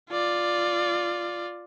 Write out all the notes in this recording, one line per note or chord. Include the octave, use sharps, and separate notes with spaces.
F4 D5